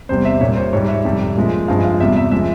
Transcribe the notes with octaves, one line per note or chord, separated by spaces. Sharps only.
E2 C3 G3 C5
E5
A#2 G3 C#5
C5
G#2 G3 C#5
E5
F2 C3 G3
A#2 F3 G#3
G2 F3 G#3 F5
F5
E2 C3 G3 E5
E5
F3 G#3 E5